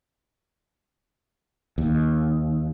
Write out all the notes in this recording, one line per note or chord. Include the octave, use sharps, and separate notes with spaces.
D#2